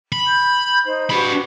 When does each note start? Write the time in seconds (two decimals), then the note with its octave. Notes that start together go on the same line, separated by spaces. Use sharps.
0.12 B5
0.26 G6
0.84 D#4 C5
1.10 D4 F#4 G4 B4 B5